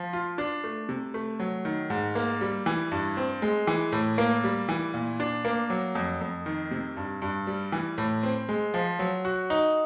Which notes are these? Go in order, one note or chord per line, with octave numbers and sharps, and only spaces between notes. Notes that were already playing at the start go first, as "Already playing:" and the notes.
Already playing: F3
F4
D4
A3
C3
A3
F#3
D#3
G#2
A#3
G3
E3
G2
C4
G#3
E3
A2
A#3
G3
E3
A#2
D4
A#3
F#3
F2
F2
D#3
C3
G2
G2
G3
E3
A2
C4
G#3
F3
F#3
F#4
D#4